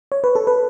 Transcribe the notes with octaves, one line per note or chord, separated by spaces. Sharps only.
C#5
B4
A4
B4